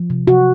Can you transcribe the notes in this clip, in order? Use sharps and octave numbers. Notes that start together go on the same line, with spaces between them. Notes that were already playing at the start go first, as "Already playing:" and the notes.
Already playing: F3
C3
C3 F#4